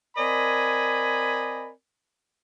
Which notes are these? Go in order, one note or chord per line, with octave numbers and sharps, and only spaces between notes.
C4 A#4 D5 D#5 G#5 B5